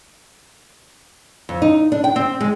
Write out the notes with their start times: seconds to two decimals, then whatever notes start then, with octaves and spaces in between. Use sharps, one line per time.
1.49 F2
1.62 D#4
1.92 D4
2.04 G5
2.16 C4
2.41 G#3